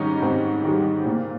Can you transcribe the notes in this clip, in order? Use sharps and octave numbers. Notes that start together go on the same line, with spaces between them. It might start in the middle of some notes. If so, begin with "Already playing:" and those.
Already playing: G#2 D#3 G3 C#4 D#4
G#2 C4
D#3 G3
A#2